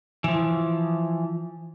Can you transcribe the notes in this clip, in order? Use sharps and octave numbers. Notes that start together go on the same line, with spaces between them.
E3 F3